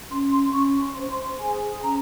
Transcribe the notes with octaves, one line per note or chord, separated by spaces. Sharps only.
C#4 C6
C6
C#4 C#6
C6
C5
C6
G#4 G#5
C#4 A#5